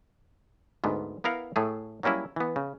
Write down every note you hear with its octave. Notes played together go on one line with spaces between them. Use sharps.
D2 G#2 B3
B3 E4 A#4 F5 F#5
A2 A3 G#4
F#3 G3 A#3 C#4 E4
E3 B3
C#3